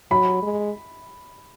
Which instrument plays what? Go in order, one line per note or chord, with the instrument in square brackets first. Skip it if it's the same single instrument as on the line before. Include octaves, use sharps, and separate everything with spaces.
[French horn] F#3 [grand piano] B5
[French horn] G#3